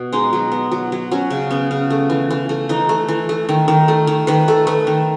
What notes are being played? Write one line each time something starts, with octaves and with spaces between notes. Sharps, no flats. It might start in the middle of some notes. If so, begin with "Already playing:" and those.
Already playing: B2
G#3 D#4
F#3
B3
F#3
F#3
F#3 C#4
C#3
B3 C#4
C#3
A3
E3
E3
A3
E3 D#4
A3
E3
A3
D#3
D#3
A3
D#3
D#3 B4
A3 A4
A3 B4
D#3